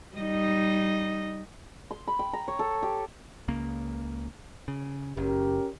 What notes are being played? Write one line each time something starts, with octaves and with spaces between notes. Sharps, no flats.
G3 D#4 D#5
C6
B5
G5
A#5
C#5
A4
G4
C#2 C#3 A#3
C#3
F#1 C#4 G4 A#4